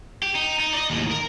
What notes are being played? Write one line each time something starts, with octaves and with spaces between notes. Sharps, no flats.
G4
D#4
D#4
D5 D#5
D#2 A2
A#4